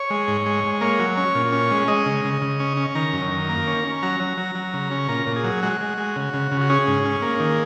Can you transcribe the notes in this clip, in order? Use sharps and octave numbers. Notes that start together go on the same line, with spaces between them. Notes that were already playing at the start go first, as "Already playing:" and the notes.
Already playing: C#5
G#3
G#2
G#3
G#3
A#3 C#5
F#3
C#4
A#2
C#4
G#3
G#3 D#5
C#3
C#3
C#3
C#4
C#4
D#3 A#5
F#2
D#3
A#3
C#4
C#4
F#3 A#5
F#3
F#3
F#3
C#3
C#4
A#2 A#5
A#2
G#4
F#3
G#3 F#4
G#3
G#3
C#3
C#3
C#3
F#4
C#4 G#4
G#2
C#4
A#3
D#3